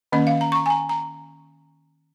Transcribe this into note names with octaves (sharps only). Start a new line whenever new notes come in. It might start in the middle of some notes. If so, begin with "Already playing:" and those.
D#3 A#3 C#4 D#5
F5
A#5
C#6
A#5
G#5
A#5
A#5